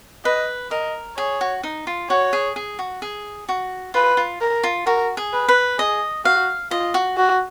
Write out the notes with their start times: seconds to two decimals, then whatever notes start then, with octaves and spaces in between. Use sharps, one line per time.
0.25 B4 D#5
0.71 A#4 D#5
1.17 G#4 C#5
1.41 F#4
1.63 D#4
1.87 F4
2.10 F#4 C#5
2.33 G#4
2.56 G#4
2.79 F#4
3.02 G#4
3.49 F#4
3.94 F4 B4
4.17 F4
4.41 A#4
4.63 F4
4.87 F#4 A#4
5.17 G#4
5.33 B4
5.49 B4
5.78 G#4 D#5
6.25 F#4 F5
6.71 F4 D#5
6.94 F#4
7.17 F#4